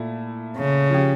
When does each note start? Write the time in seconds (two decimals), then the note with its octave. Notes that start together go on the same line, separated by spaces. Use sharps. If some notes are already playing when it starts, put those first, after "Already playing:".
Already playing: A#2 A3 E4 A4
0.57 C#3
0.90 F3 C#4 G4